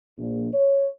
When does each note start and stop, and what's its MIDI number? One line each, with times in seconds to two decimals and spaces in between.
0.18 0.48 34
0.53 0.87 73